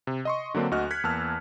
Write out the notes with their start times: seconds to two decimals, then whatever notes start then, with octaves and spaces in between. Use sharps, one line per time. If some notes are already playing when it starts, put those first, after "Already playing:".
0.07 C3
0.25 D#5 C6 C#6
0.54 D3 F#3 A#3 C4 D4
0.71 D2 F#4 D#5 F6 F#6
0.91 F#6 G#6 B6 C#7
1.04 E2 A#3 A5 E6 F6